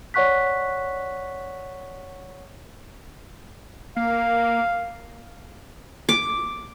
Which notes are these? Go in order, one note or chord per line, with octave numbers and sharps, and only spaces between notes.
C#5 D5 F#5 C#6 F#6 B6
A#3 F5
D6